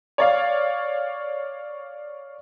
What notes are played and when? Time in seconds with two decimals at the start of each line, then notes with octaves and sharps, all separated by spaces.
0.18 C#5 D5 F5